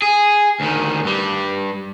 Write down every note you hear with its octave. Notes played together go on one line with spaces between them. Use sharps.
G#4
D2 D#3
G2 G3